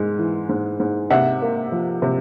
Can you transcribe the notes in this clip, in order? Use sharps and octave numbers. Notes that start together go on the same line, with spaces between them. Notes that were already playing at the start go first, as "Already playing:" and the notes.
Already playing: G#2 G#3
E3
G#2
G#2
C3 E5 F#5
A#3
F3
C3